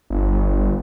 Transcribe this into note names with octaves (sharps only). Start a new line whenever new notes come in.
G1